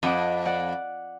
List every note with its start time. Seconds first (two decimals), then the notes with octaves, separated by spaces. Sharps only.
0.03 F2 D#5 F#5 D6
0.45 D5 F#5